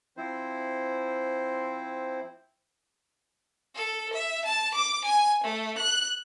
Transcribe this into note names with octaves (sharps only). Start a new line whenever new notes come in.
F3 C4 E4 C5
A4
E5
A5
D6
G#5
A3
F#6